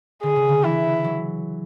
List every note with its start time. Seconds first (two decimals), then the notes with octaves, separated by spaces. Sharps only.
0.23 D3 G#4
0.36 C#3
0.49 D3
0.64 E3 E4
1.04 F#3